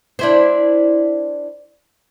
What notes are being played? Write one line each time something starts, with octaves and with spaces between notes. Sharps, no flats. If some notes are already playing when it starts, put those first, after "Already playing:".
D4 E4 C5